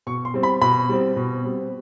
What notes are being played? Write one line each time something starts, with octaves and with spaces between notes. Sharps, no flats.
B2 C#6
C6
G3 C4
B5
B2 B5
G3 C4
B2
G3 C4